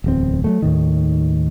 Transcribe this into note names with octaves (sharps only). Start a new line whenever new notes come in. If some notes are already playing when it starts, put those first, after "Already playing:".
D1 E2 C4
F#3 G#3 A3
D#2 A2 D#3